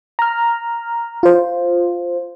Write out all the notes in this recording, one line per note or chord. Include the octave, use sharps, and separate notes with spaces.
A#5 F6
F4 C5